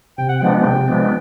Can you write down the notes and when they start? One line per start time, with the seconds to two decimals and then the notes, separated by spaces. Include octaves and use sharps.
0.18 C3 G5
0.29 F#5
0.40 F3 G#3 B3 D4 G5
0.64 C3 G5
0.88 F3 G#3 B3 D4